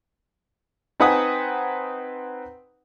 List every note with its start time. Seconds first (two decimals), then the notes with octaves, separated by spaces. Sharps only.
1.00 C4 D#4 B4 F#5 G#5 D#6